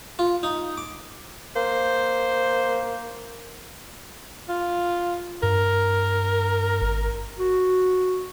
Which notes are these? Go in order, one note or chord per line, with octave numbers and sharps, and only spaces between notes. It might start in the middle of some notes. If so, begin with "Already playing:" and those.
F4
D#4
D6
A#3 C5
F4
G2 A#4
G#1
F#4